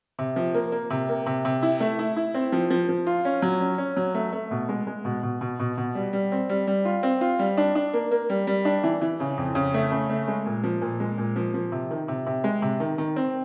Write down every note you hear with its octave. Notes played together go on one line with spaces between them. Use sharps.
C3
F3
A#3
A#3
C3
A#3
C3
C3
E4
A3
E4
E4
C4
F3
F3
F3
F4
C#4
F#3
C#4
C#4
F#3
A3
A3
B2
G#3
G#3
B2
B2
B2
B2
B2
G3
G3
C4
G3
G3
F4
C4
F4
G3
D4
D4
A#3
A#3
G3
G3
D4
E3
E3
C#3
F2
C#3
A3
C#3
A3
G#3
A#2
F3
A#2
G#3
A#2
F3
F3
C3
D#3
C3
C3
G#3
C3
D#3
D#3
C4